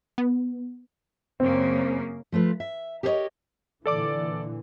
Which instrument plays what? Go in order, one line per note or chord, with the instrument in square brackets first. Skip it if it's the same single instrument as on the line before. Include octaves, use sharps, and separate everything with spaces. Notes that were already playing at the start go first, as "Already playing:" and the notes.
[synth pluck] B3
[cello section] F#2 C#3 A#3 [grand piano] C4
[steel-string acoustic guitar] F3 A3 F4 B4
E5
G4 A4 A#4 C5 C#5 D#5
[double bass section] A#2 D3 E3 [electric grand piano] A4 D5 D6